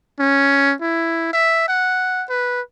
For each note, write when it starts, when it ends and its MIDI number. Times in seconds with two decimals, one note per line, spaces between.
0.19 0.74 61
0.81 1.29 64
1.33 1.66 76
1.68 2.24 78
2.30 2.61 71